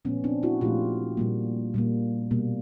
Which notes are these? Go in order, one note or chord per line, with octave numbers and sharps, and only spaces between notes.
A#2 F3 A3 B3 C#4
C4 D4
E4 F#4
A#2 F3 A3 F4 G4
A#2 G3 A#3
A#2 G3 A#3
B2 G3 A#3